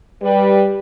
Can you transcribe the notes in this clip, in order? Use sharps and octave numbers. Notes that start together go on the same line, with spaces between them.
G3 B4